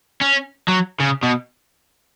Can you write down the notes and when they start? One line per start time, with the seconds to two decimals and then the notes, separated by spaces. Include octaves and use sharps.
0.21 C#4
0.68 F#3
1.00 C#3
1.23 B2